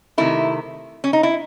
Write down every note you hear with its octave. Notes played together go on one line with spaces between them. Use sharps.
C3 D#3 A3 E4
C#4
D#4
E4